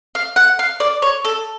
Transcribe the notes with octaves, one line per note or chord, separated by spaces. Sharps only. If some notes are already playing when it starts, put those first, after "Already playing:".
F5
F#5
F5
D5
C#5
A4